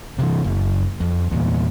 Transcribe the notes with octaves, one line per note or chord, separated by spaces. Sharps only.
C3 D#3 E3
F#1
F2
E2 A#2